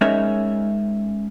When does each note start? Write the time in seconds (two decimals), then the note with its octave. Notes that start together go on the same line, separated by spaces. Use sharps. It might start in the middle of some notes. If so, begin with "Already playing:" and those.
0.01 G#3 C#4 D#4 A#4 C#5 E5